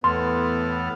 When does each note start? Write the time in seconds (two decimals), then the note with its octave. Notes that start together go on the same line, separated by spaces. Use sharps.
0.04 E2 A2 B3 A4 C6 F6